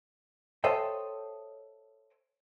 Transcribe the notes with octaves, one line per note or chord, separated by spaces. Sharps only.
A4 C5 C#5 D#5 E5 G5